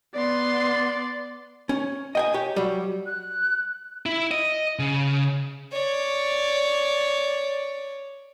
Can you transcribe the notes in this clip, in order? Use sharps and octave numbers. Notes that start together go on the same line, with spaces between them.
B3 D5 C6
C#4
D#5 G5 G#5
G4 C#5
F#3 G3
F#6
E4
D#5
C#3
C#5 D5